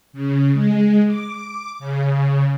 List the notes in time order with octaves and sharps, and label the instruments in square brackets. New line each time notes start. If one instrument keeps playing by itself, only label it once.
[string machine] C#3
G#3
D6
C#3